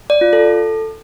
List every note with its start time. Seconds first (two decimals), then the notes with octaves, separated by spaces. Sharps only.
0.10 D5
0.21 F4
0.33 A4